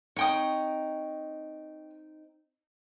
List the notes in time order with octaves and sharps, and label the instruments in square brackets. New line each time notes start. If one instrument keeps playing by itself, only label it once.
[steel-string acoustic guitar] C4 D#4 [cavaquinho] C#5 G5 D#6